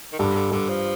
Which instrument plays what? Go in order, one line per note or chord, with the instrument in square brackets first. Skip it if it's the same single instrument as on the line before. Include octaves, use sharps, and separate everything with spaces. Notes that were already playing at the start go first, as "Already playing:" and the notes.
[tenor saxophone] D#3
[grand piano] G2 [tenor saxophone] D3
[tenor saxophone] D3
[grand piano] G2 [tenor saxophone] D3
[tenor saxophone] F3